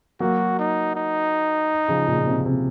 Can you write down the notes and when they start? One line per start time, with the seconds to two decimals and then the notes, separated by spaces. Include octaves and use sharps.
0.20 F#3 A#3 F#4
0.59 D#4
0.95 D#4
1.89 C#3 F3
2.08 A#2 C#3
2.19 A#2
2.27 C3
2.41 A#2
2.46 C3